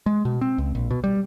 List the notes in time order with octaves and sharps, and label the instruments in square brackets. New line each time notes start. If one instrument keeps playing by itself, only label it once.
[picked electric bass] G#3
B2
C4
C#2
A#1
B2
G3